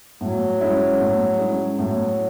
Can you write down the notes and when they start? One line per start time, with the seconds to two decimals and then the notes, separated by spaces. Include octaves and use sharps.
0.21 A2 F#3
0.61 G#3 C#4 E4
1.00 A2
1.39 G#3 C#4 E4
1.78 A2 F#3